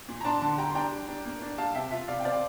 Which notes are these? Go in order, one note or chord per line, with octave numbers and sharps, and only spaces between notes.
A#2
A#5
D4 A5 C6
D3 A5 C6
G3 G5 A#5
C6
D4 G5 A#5
G3
D4
A#3
D4
G3 F5 A5
C3 E5 G5
F4 E5
C3 D5 F5
G5
C4 D5 F5